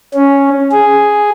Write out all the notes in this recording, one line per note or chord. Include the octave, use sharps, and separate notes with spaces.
C#4
G#4